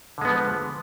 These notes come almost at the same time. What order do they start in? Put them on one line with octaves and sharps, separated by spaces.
D3 G#3 B3 F3